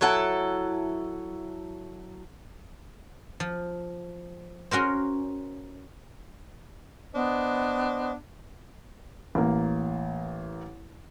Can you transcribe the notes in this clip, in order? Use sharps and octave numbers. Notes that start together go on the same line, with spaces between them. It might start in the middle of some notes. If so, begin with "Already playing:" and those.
F#3 E4 A4 F#5
F3
C#4 F#4 A#4 C5
B3 D4 C5 D#5
A1 A#3